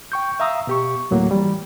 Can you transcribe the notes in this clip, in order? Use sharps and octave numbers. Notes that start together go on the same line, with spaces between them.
G5 C#6 G6
E5 F5 A#5 D#6 E6
B2 G4 C#6
D2 A2 F#3 A#3
E3 G3